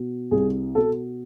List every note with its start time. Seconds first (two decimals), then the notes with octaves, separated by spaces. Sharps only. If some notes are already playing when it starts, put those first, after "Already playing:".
Already playing: B2
0.31 C2 G#4
0.75 B2 A4